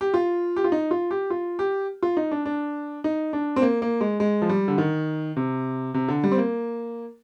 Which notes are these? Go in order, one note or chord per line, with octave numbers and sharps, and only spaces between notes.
G4
F4
G4
F4
D#4
F4
G4
F4
G4
F4
D#4
D4
D4
D#4
D4
C4
A#3
A#3
G#3
G#3
F3
G3
D3
D#3
C3
C3
D3
G3
C4
A#3